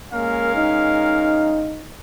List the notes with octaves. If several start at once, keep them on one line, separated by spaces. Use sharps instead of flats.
G#3 A#3 C#4 A#4 F5
D#4